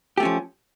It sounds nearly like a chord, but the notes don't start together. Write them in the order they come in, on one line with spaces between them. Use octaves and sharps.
G4 A3 C#4 F3